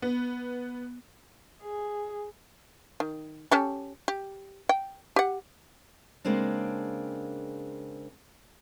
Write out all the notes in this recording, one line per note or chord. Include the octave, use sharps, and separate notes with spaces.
B3
G#4
D#3
C#4 G4 A4
G4
G5
G4 F#5
C#3 G#3 A#3 C4 D4